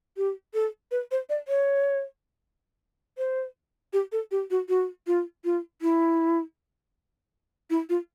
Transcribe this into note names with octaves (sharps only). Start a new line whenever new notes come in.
G4
A4
B4
C5
D5
C#5
C5
G4
A4
G4
F#4
F#4
F4
F4
E4
E4
F4